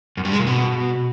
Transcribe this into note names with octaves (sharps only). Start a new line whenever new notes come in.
F#2
G2
G#3
A#2
B2